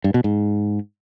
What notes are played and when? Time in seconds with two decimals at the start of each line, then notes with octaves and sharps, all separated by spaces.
0.04 G2
0.14 B2
0.24 G#2